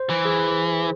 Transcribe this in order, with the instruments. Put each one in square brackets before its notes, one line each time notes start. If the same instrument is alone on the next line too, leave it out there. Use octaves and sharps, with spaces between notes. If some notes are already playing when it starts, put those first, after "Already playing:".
Already playing: [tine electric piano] C5
[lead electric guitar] E3
[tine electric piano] G#4